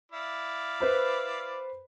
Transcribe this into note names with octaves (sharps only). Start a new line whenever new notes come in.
E4 D5 F5
B4 C5 B5